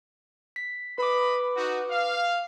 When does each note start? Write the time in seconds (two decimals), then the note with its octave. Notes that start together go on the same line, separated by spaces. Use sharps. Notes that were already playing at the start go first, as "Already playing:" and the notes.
0.56 B6
0.98 B4 D#5 B5 D6
1.56 D#4 F#4
1.90 F5